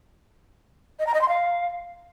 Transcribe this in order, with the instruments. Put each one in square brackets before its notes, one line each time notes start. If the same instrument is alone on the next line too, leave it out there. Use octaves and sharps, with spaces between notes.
[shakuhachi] D#5
A#5
D#5
C6
F5